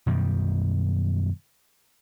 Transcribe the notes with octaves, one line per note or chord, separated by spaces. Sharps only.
F#2 B2 D#3 G3